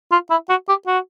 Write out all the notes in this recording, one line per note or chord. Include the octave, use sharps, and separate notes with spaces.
F4
E4
F#4
G4
F#4